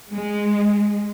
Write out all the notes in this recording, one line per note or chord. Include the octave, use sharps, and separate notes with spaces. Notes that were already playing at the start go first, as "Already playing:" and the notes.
G#3